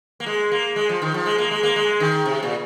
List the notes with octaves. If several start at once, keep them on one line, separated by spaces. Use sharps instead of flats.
A#3
G#3
A#3
G#3
F3
D#3
F3
G#3
A#3
G#3
A#3
G#3
D#3
C3
A#2